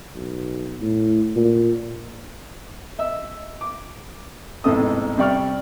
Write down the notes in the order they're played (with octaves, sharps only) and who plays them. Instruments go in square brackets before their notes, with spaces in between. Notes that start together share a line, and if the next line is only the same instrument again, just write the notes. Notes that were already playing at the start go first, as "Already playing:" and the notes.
[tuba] B1
A2
A#2
[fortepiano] D#5 E5 E6
D6
A1 E2 G#2 C3 A4 D#6
C3 G3 D5 C#6 F6